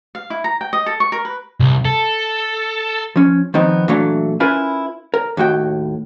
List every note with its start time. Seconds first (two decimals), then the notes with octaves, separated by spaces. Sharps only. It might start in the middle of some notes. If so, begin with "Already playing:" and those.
0.15 F5
0.30 E4
0.44 A#5
0.61 G5
0.73 D#5
0.86 A4
1.00 C#6
1.12 A#4
1.25 B4
1.60 C2
1.85 A4
3.16 F3 C#4
3.54 D#3 F3 B3 C4 D#4
3.88 A#2 E3 F#3 A3 D4
4.40 C#4 E4 F4 A#4 B4 G#5
5.14 A#4
5.37 D#2 A2 F#4 G5